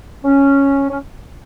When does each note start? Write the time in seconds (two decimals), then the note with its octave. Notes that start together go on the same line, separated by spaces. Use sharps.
0.24 C#4
0.90 C#4